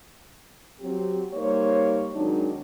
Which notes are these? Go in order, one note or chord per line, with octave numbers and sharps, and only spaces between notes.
F#3 C4 G4
G3 A#3 D#4 C5 C#5
D#3 F#3 G#3 C4 D4 D#4